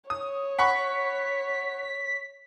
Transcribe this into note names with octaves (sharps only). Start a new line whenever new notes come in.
C#5 D#6
F#5 B5 C#6 B6